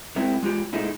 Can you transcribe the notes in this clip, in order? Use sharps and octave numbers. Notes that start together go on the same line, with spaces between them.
G#3 C4 E4 A#4
G#3 F4 G4
A#2 G#3 A3 D#4 E4